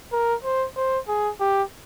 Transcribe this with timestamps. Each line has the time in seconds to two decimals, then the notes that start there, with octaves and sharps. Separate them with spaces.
0.12 A#4
0.44 C5
0.76 C5
1.08 G#4
1.40 G4